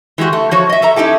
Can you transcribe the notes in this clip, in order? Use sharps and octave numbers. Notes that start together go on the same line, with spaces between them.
E3 G#3 C4 F#4 G4
A3
F3 F#4 C#5
D#5 E5
A4 E5 A#5
C#4 D#4 E4 G4 A4